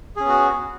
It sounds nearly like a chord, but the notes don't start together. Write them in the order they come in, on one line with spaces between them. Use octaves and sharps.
G#4 C#4 B3 F#4